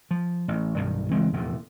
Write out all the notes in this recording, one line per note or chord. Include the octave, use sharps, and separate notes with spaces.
F3
A1
B1 G2 D#3
C#2 E3 G#3 C4
F1 E2 A#2